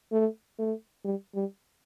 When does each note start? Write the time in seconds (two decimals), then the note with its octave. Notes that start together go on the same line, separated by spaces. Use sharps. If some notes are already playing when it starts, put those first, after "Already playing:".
0.12 A3
0.59 A3
1.04 G3
1.35 G3